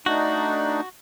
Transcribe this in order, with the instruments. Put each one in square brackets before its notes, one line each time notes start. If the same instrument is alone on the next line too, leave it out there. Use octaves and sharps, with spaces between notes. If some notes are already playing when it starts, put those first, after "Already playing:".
[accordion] A3 D4 D#4 [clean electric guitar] F#4